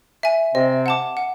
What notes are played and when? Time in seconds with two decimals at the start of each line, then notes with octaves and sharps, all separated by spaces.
0.23 E5 G#5
0.55 C3 C4 D#5
0.86 F#5 A5 D6
1.17 F#5